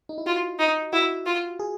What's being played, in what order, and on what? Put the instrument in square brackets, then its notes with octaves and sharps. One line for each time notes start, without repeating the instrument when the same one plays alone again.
[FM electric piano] D#4
E4
[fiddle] F4 [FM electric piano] F#4
[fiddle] D#4
[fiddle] E4 [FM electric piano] F#4
[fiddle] F4
[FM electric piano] G#4